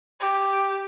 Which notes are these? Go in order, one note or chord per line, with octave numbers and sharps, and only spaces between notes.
G4